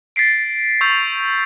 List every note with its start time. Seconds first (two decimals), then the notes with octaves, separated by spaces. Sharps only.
0.16 A6 B6 C7 D7
0.81 C#6 E6 G6 F7